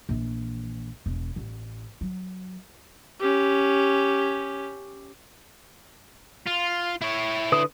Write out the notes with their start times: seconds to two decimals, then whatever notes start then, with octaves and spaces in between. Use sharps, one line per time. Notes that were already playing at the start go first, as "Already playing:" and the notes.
0.09 A#1 E3
1.06 E1
1.36 A1
2.01 F#3
3.21 C#4 G4
6.47 F4
7.02 E4 C#5
7.52 D3 B4 D#6